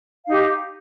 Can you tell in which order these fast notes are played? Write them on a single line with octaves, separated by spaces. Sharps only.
F5 D#4 G4